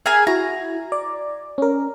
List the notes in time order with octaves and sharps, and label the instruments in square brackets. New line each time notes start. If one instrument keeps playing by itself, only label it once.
[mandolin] G#4 A#4 G#5 [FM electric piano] E5
[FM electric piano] E4 F#4 [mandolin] A#5
[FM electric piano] D5
C#4 A#4